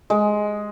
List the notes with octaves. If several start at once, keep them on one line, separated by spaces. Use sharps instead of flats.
G#3